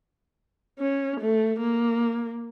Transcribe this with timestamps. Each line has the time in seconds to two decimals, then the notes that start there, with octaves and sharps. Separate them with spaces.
0.79 C#4
1.20 A3
1.60 A#3